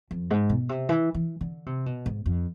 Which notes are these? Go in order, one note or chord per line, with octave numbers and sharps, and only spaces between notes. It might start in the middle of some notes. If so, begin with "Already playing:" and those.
F2
G#2
B2
C3
E3
E3
D3
C3
B2
G#2
F2